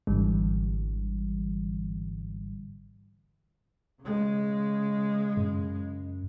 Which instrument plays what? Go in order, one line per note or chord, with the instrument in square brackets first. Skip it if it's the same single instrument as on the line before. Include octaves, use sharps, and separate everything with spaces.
[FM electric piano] G#1 G#2 D3 E3 G3
[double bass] C#3 G#3
[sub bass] F#2